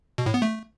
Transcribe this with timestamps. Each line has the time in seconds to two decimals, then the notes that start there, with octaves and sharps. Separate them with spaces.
0.18 B2
0.26 A2
0.34 B3
0.42 A3